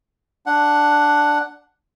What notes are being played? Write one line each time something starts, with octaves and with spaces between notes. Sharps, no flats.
D4 F#5